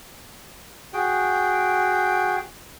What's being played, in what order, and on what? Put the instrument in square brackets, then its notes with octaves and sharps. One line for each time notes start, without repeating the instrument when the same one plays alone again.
[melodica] F#4 G#4 G5